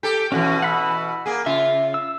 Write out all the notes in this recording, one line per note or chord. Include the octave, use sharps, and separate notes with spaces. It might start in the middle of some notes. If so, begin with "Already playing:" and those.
G4 A4
B2 E3 C#4 F#4
F#5 B5 E6
A#3 G#4
C#3 F4 E5
E6